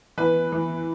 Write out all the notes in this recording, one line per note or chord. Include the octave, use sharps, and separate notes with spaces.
E3 B4
E3